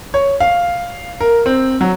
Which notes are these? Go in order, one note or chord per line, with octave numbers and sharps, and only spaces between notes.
C#5
F5
A#4
C4
F#3